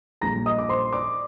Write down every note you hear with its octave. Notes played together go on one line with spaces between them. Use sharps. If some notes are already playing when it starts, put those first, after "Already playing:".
A#1 A#2 G3 A#5 A#6
D#5 D#6
D6
C5 C6
D5 D6